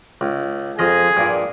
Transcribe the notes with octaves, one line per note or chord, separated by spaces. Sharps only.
C#2
F2 F3 G#4 D#5
G2 A#2